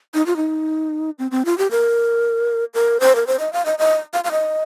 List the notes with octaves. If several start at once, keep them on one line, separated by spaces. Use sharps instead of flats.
D#4
F4
D#4
C4
C4
F4
G4
A#4
A#4
C5
A#4
C5
D#5
F5
D#5
D#5
F5
F5
D#5